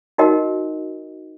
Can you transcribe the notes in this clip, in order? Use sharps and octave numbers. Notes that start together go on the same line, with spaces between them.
D#4 F#4 A#4 D#5 G5